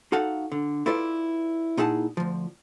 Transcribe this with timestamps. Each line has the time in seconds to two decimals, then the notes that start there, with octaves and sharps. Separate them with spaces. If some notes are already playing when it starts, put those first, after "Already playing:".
0.12 D#4 F#4 A4 F5 F#5
0.52 D3
0.86 E4 F4 A4 B4 D5
1.77 A#2 D#4 E4 G#4 F#5 A5
2.17 D2 F3